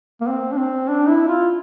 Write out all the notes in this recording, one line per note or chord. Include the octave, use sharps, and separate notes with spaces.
A#3
C4
D4
C4
D4
E4
F4